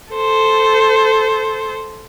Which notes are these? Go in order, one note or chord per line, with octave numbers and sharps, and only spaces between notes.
A4 C5